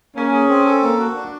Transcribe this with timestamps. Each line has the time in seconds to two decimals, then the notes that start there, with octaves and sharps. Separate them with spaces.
0.15 A#3 C#4
0.32 G#4
0.49 C4
0.65 A4
0.82 A#3
0.99 F#4
1.15 D4